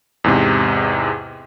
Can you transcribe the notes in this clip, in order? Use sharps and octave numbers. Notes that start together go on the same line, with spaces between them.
E2 G#2 C3